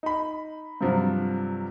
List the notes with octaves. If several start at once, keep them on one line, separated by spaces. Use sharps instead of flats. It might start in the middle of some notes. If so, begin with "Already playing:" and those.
D#4 B5
G2 C3 F3 F#3